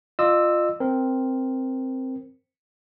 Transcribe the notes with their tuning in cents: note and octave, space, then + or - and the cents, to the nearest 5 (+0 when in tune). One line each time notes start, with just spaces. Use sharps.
F4 +0 D#5 -40 E6 +0
C4 +0 A#4 +0